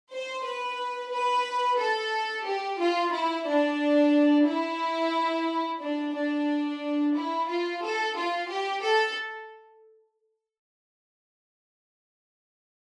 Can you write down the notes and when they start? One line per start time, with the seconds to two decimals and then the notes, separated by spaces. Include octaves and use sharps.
0.11 C5
0.45 B4
1.12 B4
1.79 A4
2.46 G4
2.79 F4
3.13 E4
3.46 D4
4.47 E4
5.81 D4
6.15 D4
7.15 E4
7.48 F4
7.82 A4
8.15 F4
8.49 G4
8.82 A4